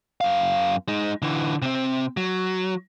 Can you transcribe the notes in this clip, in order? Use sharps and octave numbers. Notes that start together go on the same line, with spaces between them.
F#2 F5
G#3 D#4
D3 E3
C3 C4
F#3